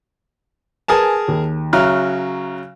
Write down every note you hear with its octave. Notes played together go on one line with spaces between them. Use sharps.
G#4 A#4 B4 G#5 A5
D#2
C#3 F#3 E5 A#5 F6 F#6